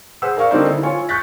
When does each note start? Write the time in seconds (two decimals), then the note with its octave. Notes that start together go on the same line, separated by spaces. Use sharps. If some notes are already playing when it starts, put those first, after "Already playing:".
0.22 G#4 B4 C5 F#5 E6
0.37 A#4 D5 F5 C#6 F6
0.51 D3 G3 A#3 C4 D#4 C5
0.69 E4
0.83 F4 C#5 G#5
1.09 C#6 F#6 G6 A6 B6